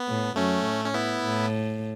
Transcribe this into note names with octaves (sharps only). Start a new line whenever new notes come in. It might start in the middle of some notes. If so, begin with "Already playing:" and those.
Already playing: B3
A2
F#2 A3 C#4
A2
C#4
B3 E4
A2